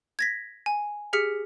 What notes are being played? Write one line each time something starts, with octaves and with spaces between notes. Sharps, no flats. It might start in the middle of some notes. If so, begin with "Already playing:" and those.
G#6 A#6 B6
G#5
G4 G#4 F6 B6 C#7